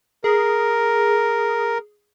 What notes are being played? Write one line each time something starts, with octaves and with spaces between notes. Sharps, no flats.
G#4 A#4